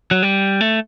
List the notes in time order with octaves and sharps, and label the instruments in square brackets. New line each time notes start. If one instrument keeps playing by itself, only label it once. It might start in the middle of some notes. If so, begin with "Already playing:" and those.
[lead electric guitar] F#3
G3
A3